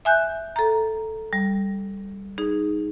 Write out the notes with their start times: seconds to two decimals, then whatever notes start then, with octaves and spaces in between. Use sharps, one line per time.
0.05 E5 G#5 F#6 G6
0.56 A4 A#5
1.33 G3
2.38 D#4 G#4